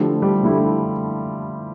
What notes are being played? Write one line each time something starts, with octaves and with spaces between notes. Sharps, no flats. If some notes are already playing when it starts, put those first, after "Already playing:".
Already playing: D3 F3 A3 E4 G4
G3
D3 A3 E4 G4